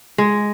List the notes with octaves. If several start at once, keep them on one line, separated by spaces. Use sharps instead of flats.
G#3